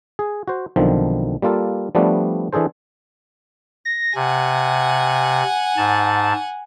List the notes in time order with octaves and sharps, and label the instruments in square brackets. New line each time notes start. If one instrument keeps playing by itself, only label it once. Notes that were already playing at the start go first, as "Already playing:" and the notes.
[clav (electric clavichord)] G#4
F#4 C5
B1 D3 D#3 F3 C4
G3 A#3 F4 A4
F3 G3 A3 B3 D4
E3 D4 G#4 A4 C5
[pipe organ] A#6
[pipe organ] C3 [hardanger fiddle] F#5 G#5
[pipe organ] G#2 A5